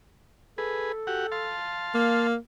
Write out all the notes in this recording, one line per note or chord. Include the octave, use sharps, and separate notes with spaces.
G#4 A4 B4
F#4 G4 F#5
F5 A5 C6
A#3